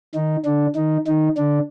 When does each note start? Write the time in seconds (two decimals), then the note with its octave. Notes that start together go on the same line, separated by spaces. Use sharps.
0.15 D#3 D#4
0.45 D3 D4
0.76 D#3 D#4
1.07 D#3 D#4
1.37 D3 D4